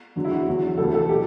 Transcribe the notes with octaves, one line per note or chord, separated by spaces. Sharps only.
E2 D3 F#3
E4
F#4
E2 D3 F#3
D2 C3 E3 A4
A4
B2 F#3 G4